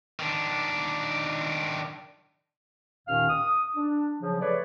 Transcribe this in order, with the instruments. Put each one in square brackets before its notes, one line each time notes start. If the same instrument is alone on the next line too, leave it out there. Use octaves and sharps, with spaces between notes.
[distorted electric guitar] D#3 D4
[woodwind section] D#2 A#2 D#3 C#4 F5 F6
D#6
D4
C#3 F3 F#3
A3 G#4 B4 C#5 D5